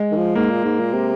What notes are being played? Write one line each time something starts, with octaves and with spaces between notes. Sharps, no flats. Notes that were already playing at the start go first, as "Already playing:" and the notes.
Already playing: G#3
D#3
F3
G#2 A#3
A#2
G#2
A#2
C3